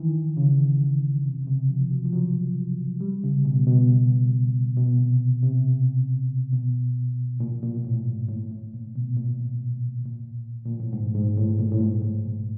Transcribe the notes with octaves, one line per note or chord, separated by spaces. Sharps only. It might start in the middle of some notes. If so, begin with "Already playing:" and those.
Already playing: D#3 E3
C#3
C3
C#3
C3
F3
F#3
F3
F#3
G3
C#3
B2
B2
B2
C3
C3
B2
A#2
A#2
A2
G#2
A2
A2
A#2
B2
A#2
A#2
A#2
A2
G#2
G#2
A2
A#2
A2
G#2
A2
A#2